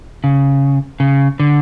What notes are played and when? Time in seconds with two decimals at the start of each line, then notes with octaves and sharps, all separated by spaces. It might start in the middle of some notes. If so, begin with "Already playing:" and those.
0.24 C#3
1.00 C#3
1.40 D3